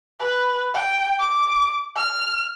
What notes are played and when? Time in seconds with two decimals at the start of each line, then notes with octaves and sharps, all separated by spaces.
0.20 B4
0.74 G5
1.19 D6
1.95 F6